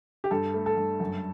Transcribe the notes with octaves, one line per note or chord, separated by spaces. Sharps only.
G4
G2 A4
A3
A4
G2
F#2